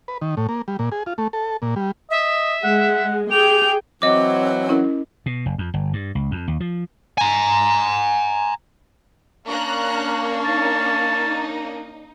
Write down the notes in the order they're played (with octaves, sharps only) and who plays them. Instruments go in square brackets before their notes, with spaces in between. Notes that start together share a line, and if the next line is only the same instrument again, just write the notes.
[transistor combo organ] B4
D#3
A2
A#3
G3
A#2
G#4
F4
A3
A4
A#2
G3
[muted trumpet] D#5 [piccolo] E5
[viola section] G#3 [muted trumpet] F#5
[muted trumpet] G4 [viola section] G#4 G5 [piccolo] F7
[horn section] E3 F#3 [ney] C4 [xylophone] D#5 D6
[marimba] C#4 E4 A#4
[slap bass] B2
F#1
F2
G1
G2
C#2
F2
D#2
F3
[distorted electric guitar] G#5 A#5
[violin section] A#3 C#4 D4 [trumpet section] F5 C#6 [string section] A#5 F#6
[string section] D#4 [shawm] A5